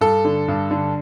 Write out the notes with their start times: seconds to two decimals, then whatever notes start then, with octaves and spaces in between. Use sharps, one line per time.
0.01 G2 A4
0.25 D3
0.48 G2
0.71 D3